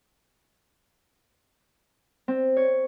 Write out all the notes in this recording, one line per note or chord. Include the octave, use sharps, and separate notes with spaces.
C4
C#5